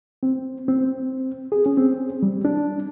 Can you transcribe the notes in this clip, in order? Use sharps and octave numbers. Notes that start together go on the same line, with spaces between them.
C4
C4
G#4
C#4
C4
G3
D4